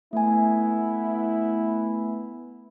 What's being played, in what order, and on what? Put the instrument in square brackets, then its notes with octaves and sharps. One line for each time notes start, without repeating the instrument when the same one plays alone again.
[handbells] A3 G#5 [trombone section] B3 E4